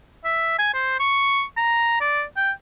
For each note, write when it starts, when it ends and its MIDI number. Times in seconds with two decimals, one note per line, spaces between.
0.24 0.55 76
0.58 0.72 80
0.74 0.97 72
0.99 1.43 85
1.57 1.97 82
2.01 2.23 74
2.36 2.51 79